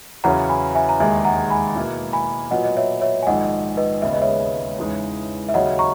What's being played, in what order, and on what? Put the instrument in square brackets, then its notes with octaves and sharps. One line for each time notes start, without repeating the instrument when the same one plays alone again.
[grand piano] E2 C#3 F#3 C#4 E4 [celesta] F#5 A#5
[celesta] G#5 B5
E5 G#5
A#5
[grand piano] E1 D#2 D#3 G#3 [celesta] E5 G#5
[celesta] F#5 A#5
G#5 B5
[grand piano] B2 A#3 E4
[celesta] G#5 B5
[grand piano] A#2 F#3 B3 [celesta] D#5 F#5
[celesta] D#5
C#5 E5
C#5 E5
G#5
[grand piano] A#1 G#2 D#3 G#3 D#4 [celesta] D#5 F#5
[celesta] B4 D#5
[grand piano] E1 D#2 C#3 G#3 B3 [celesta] E5
[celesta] D#5
C#5 E5
[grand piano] E2 C#3 E3 G#3 D#4
[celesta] E5
[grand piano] D#2 C#3 F#3 C#4 [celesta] D#5 F#5
[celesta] A#5 C#6